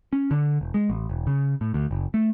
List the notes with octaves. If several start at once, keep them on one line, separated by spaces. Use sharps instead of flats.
C#4
D3
E1
G#3
A1
E1
C#3
A2
D2
F#1
A3